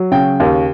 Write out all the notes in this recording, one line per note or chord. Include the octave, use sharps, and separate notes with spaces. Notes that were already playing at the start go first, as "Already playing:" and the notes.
Already playing: F#3
C#3 G5
D#2